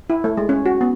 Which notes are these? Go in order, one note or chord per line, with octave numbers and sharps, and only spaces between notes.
E4
A3
G#3
C#4
F#4
B3